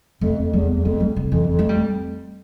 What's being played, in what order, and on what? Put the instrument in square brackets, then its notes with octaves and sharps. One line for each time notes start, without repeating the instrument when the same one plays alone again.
[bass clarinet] F2 [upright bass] A3
[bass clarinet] F2
[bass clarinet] E2 [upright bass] G3
[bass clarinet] E2
[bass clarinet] F2 [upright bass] A3
[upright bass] G3
D3
[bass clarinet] F2 [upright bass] E3
[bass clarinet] F2
[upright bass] A3
G3